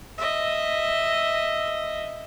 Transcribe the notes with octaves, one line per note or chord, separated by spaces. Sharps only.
D#5 E5